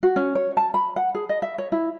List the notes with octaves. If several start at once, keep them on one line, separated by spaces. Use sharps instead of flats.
F#4
C#4
C#5
A5
B5
F#5
G#4
D#5
E5
C#5
E4